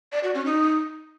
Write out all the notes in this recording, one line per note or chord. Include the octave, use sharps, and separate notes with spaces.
D5
F#4
C#4
D#4